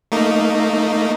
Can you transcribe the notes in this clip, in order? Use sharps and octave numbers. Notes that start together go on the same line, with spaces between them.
A3 A#3 D#4